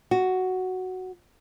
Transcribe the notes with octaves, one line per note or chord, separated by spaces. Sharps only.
F#4